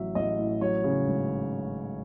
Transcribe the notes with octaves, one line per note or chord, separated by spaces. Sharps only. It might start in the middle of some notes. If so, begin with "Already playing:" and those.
Already playing: A1 F#3 E5
A1 D#5
A2
F#3 C#5
C#3
G#1